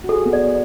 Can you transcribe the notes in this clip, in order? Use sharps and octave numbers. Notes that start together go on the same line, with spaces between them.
F#4
G#4 A4
B3
D5